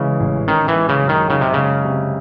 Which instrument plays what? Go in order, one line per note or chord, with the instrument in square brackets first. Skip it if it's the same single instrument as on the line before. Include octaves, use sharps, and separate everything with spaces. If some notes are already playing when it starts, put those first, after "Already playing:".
Already playing: [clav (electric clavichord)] C#3 [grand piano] E3 G#3
[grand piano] A1
[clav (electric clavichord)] D#3 [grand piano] C#4
[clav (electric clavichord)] E3
[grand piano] G#3
[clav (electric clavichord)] C#3
[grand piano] F#2
[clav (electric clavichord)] D#3
[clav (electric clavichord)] C#3 [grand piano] D#4
[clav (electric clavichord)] C3
[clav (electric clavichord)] C#3 [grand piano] G#3
[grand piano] C3